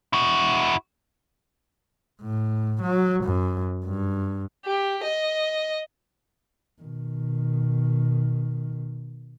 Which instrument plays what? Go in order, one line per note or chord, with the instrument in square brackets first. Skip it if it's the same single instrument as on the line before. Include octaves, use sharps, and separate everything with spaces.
[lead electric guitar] E4 F#4
[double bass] A2
F#3
F#2
G2
[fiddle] G4
D#5
[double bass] B2 D#3